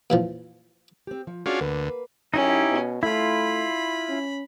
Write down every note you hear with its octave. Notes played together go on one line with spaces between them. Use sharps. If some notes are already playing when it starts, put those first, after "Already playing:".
A#2 E3 F3
C4 G4
F3
C#4 D4 F4 F#4 G#4 D5
D2 A#3 B4
F#2 C#4 D#4 E4 G4
B2
A3 E4 F4 B5
C#4